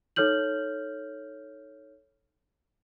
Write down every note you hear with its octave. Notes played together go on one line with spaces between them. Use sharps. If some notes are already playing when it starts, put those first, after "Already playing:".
D#4 A4 C#5 F6 G6 F#7